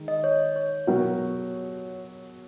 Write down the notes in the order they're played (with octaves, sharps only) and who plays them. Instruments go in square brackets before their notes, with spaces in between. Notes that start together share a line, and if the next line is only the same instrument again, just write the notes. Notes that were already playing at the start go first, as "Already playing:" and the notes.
Already playing: [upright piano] D#3 G#3 D#4
[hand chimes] D#5
C#5
C#5
[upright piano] B2 F#3 B3 F#4 A#4